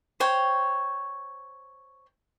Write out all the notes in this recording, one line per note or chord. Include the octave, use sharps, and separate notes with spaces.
C5 C#5 G5